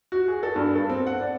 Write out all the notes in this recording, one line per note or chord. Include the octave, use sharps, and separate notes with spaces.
F#4
G#4
A4
G2
A4
C4
F#5
D5